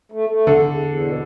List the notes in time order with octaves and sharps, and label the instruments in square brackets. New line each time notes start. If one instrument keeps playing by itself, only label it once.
[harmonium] A3
A3
[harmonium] E2 [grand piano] D3
[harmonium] E2
E2
B2